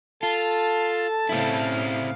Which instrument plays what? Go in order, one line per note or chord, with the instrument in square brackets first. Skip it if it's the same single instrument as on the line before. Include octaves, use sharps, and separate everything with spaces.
[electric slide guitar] F4 [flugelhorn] A4 [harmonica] A5
[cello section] A2 C#3 F5 [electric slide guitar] C4 E4